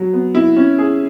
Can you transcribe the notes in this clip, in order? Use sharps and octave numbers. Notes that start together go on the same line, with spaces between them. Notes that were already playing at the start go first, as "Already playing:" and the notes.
Already playing: F#3
B3
E4
C#4
G#4